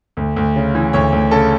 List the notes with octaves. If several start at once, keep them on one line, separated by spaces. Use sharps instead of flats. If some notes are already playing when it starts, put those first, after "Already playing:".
D2
D2
C#3
E3
D2 C#5
D2
C#3 A4